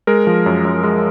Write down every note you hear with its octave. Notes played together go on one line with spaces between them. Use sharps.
G#3 A#4
F3
F#2
F#2
G#3